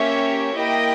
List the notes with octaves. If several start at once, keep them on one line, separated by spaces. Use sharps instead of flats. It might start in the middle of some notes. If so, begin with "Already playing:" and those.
Already playing: A#3 C#4 G4 C#5 E5
A#3 E4 G4 D#5 G5